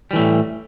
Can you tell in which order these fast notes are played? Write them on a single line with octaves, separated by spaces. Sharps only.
G3 E3 A3 A2